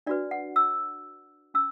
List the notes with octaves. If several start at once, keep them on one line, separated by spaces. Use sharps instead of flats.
D4 F#4 B4 D5
F#5
E6
C#4 E6